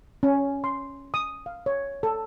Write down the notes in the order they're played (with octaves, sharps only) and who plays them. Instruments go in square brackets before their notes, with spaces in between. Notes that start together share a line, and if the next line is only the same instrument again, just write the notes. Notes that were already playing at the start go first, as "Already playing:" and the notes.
[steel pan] C#4
C6
D#6
F5
C#5
A4